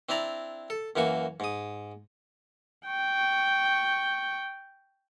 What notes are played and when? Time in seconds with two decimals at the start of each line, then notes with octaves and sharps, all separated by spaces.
0.09 C4 D4 E4 D5 A#5
0.70 A4
0.96 F#2 E3 A#3 F#4 C#6
1.40 G#2 D#6
2.86 G5 C#6